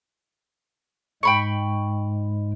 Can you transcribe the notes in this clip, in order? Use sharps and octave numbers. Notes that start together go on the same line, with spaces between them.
G#2 G#3 G5 B5 C#6